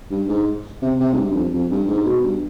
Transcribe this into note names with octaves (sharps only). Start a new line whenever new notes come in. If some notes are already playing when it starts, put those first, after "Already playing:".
G2
G#2
C3
C3
G#2
G2
G2
F2
F2
G2
G#2
B2
G2